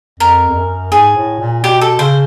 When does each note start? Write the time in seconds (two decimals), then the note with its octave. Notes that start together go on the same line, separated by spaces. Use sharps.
0.19 F2 A#4
0.48 F2
0.55 F#2
0.92 G#2 G#4
1.16 A2
1.39 A#2
1.64 B2 G4
1.81 A4
1.99 C#3 C5